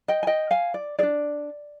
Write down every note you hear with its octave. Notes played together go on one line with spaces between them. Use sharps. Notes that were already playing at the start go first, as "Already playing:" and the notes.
D#5 G5
G#5
D#5 G5
F5 G#5
D5
D4 G#4 D5